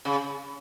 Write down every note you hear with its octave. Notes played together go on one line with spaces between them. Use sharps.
C#3